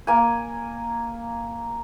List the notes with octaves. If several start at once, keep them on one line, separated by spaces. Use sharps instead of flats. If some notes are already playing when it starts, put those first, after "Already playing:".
A#3 G#5